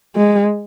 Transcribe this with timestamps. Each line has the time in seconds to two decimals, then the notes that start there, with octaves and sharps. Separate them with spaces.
0.16 G#3